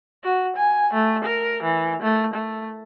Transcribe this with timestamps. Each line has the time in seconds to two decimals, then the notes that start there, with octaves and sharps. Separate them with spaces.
0.24 F#4
0.56 G#5
0.93 A3
1.24 A#4
1.63 E3
2.02 A3
2.34 A3